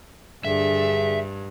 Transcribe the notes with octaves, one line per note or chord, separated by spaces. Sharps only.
G2 D3 G#4 E5